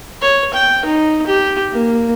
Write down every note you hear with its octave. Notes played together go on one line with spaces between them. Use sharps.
C#5
G5
D#4
G4
A#3